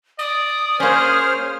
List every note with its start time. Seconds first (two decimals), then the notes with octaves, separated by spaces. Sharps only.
0.19 D5 D#6
0.80 A#3 C#4 G#4 C5 F6